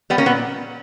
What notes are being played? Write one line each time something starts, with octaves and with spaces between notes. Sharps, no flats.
G3 B3
A#3 C#4
A#2 B3